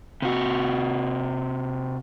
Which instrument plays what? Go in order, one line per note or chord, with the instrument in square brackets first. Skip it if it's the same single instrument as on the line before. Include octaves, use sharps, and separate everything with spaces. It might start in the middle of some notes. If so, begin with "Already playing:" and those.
[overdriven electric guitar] C3 F#4